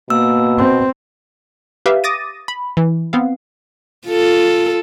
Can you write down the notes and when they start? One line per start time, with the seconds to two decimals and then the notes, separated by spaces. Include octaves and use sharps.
0.10 B2 A#3 E6
0.58 C4
1.86 G4 B4 E5 F5
2.04 D6 D#6 A6 A#6 D#7
2.48 B5
2.77 E3
3.13 B3 C4 F5
4.08 F4 A4